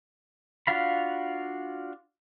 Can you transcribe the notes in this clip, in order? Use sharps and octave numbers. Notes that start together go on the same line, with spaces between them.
D4 F4 F#4 F5 B5